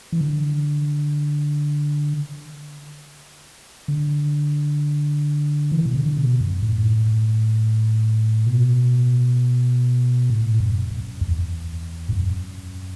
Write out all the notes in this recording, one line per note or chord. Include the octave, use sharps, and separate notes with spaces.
E3
D3
D3
E3
B2
D3
B2
F#2
A2
B2
A2
F#2
F#2
E2
A2
F#2